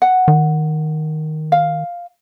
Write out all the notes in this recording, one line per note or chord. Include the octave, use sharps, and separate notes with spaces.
F#5
D#3
F5